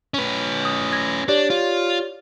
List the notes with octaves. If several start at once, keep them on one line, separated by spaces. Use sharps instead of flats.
C#4 B4
D#6
G#6 A#6
D4 G4 C#5 D5
F4